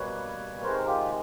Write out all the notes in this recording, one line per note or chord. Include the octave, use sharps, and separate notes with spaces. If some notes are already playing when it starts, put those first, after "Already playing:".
Already playing: B2 G3 A#3 B4 C#5
C3 D#3 G#3 A#4 C5
F4 G4